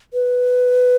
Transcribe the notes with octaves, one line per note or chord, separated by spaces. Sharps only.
B4